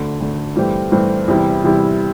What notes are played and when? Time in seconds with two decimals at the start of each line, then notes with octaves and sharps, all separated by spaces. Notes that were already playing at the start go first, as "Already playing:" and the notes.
Already playing: D2 D3 A3
0.20 D2 D3 A3
0.56 G2 E3 A3 C4 G4
0.92 G2 E3 A3 C4 G4
1.28 E2 C3 G3 E4
1.64 E2 C3 G3 E4